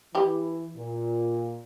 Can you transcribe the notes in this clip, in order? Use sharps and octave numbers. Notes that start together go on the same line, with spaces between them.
E3 E4 G4
A#2